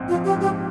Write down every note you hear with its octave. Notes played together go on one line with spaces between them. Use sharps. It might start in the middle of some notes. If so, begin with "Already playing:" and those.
Already playing: A#1 G#2 F3 C4
F4
F3
G4
G#2
G4